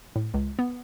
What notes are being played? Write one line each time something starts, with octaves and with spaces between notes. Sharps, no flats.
A2
C#2
B3